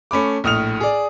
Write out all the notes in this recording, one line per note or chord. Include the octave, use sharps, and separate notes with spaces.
A3 C#4 B5 D6
A#1 A2 D#6 F6 F7
G#4 D5